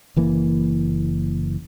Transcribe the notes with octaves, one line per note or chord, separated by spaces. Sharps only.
F#1 E3 A#3